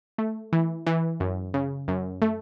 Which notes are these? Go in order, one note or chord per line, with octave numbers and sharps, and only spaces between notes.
A3
E3
E3
F#2
C#3
F#2
A3